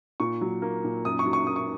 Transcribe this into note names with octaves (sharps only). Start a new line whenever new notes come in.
A#2 C#6
F#3
A#3
A#2
F#2 D#6
C#6
F#3
C#6
A#3 D#6
C#6